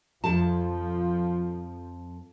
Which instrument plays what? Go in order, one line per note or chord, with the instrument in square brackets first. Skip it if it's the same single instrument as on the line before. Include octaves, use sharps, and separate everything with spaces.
[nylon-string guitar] F2 A4 A5 [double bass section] F3